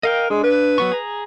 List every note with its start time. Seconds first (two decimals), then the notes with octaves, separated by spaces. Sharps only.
0.03 A#4 D#5 F5 G5
0.30 G#3 D4
0.44 B4
0.78 F#3 B3 C#6
0.92 G#4 A#5